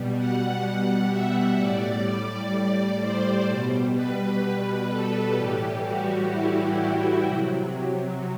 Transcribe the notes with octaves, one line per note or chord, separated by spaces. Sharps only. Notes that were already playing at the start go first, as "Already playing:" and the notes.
Already playing: B2 G3
F#5
F#5
E5
A2 G3 D5
C5
B2 G3
B4
A4
A2 E3 G3 G4
F#4
E4
F#4
C3 F#3